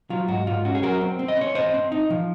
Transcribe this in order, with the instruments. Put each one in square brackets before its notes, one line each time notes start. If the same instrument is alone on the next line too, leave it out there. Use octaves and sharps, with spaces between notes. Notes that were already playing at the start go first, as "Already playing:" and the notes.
[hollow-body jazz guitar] F#3 F4
G#2 F#4
G#2 F4
C#4 F#4
G#4
F#3 F#4 A#4
C4
C4
D#5
C4 C#5
C4 C5 D#5
C4
D#4
F3